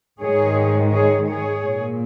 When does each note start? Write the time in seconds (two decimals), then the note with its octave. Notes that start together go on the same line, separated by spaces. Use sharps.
0.20 G#2 D#3 G#3 G#4 C#5
0.91 G#4 C#5
1.28 G#4 C#5
1.64 A#2 A#3